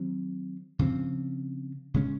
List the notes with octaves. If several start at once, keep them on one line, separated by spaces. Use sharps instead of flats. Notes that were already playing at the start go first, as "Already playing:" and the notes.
Already playing: D#3 F#3 C4
C#3 F3 C4
C#3 G#3 C#4